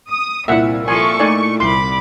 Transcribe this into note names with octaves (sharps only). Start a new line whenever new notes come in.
D#6
C2 A#2 E4 E5 F#5
F3 A4 G#5 C#6
A3 D#4 D5 G#5
C2 B5 C6 D6